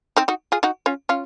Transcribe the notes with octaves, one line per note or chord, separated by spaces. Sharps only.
C4 D#4
D#4 F#4
F4 G#4
D#4 F#4
C#4 F4
C#4 F4